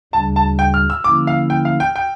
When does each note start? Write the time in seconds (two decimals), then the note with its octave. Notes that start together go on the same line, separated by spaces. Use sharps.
0.13 D2 C#3 G3 D4 A5
0.36 A5
0.59 G5
0.74 F6
0.90 E6
1.04 D3 F3 A#3 C#4 E4 D6
1.27 F5
1.50 G5
1.65 F5
1.80 G5
1.96 G5